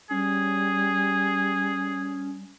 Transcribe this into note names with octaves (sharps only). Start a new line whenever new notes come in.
G3 C#4 G#4